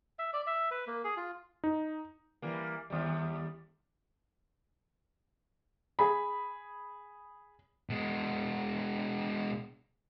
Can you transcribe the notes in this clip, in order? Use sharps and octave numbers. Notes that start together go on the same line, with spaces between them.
E5
D5
E5
B4
A#3
G#4
F4
D#4
E3 G3 A#3
D#2 G3
G#4 B5
B2 G#3